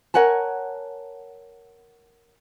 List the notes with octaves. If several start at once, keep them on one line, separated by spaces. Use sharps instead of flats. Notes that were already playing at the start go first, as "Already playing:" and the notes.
A#4 C#5 F#5 G#5 A5